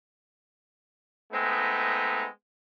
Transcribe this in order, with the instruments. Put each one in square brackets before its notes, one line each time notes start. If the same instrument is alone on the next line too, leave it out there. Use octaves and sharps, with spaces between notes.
[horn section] G#3 A3 B3 C4 D#4